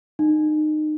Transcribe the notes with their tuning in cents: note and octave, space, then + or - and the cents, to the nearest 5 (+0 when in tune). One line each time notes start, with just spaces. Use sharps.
D#4 -25